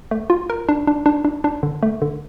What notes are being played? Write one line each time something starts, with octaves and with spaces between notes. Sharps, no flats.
A3
F4
A#4
D4
D4
D4
D4
D4
D3
A3
D3